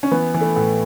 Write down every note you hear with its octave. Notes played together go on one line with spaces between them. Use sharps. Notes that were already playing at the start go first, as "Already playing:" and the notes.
C#4
E3 B3
E3
A3
A2